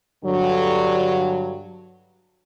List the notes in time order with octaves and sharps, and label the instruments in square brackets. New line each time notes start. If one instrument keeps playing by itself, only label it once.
[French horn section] G2 D3 F#3